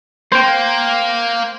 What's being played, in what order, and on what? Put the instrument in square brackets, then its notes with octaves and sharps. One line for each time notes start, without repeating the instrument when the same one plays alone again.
[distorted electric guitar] A#3 [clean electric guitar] C5 G5